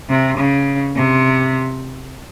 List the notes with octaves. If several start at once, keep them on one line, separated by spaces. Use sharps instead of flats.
C3
C#3
C3